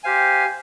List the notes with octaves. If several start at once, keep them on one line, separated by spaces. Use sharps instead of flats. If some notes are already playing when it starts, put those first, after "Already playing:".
G4 C5 F5 G#5